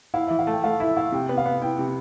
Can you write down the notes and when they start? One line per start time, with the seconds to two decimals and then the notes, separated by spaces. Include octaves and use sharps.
0.14 E4 F5
0.27 E3 E5
0.39 F5
0.47 A3 G5
0.64 A3 F5
0.80 E4 E5
0.97 E4 F5
1.12 C3 G5
1.29 B3
1.38 F5
1.46 B3
1.61 E4 G5
1.79 C3